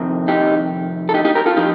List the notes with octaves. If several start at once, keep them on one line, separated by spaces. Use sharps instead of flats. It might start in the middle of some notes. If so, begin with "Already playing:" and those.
Already playing: F2 C3 D#3
D#4 G4
A4
D#4 G4
D#4 G4
G4 A#4
F4 A4
F3 D#4 G4